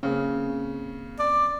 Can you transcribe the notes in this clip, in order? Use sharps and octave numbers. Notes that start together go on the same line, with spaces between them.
C#3 A#3 C4 C#4
D5